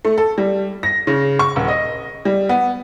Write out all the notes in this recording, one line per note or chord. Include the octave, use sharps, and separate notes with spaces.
A3
A4
G3
A#6
C#3
C#6
D#1
D#5
G3
B3